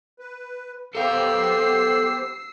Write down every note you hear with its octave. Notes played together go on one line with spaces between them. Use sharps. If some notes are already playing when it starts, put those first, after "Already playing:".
B4
B3 G4 A4 C5 F5 E6 C7